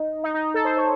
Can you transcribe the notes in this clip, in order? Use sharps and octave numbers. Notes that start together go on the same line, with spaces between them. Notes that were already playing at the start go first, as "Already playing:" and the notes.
Already playing: D#4
D#4
D#4
A4
C5
C#5